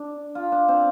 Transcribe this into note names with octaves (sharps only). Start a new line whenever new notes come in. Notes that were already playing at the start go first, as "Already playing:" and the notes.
Already playing: D4
F4
D4
C4